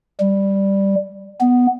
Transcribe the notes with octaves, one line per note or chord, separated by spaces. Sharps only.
G3
B3